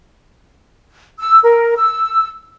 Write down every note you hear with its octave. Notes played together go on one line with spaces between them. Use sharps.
E6
A#4
E6